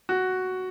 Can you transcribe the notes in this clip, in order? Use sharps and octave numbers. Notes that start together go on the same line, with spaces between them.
F#4